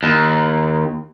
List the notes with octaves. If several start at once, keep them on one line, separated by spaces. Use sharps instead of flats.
D#2